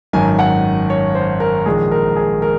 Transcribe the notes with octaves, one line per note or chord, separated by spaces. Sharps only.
G#1 F#2 D#3 G#5
F#5
C#5
C5
A#4
A#1 G#2 D#3 G#3 G#4
A#4
G#4
A#4